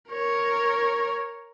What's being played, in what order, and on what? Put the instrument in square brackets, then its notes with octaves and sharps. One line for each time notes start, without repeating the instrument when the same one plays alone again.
[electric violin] A#4 C#5